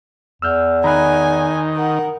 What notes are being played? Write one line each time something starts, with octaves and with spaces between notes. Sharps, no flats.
E2 E6 F6 G6
D#3 G#5 A#5 B5 F#6
A#4 F#5